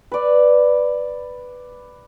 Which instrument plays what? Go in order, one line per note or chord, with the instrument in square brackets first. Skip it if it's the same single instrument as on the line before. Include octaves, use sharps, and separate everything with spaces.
[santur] B4 D5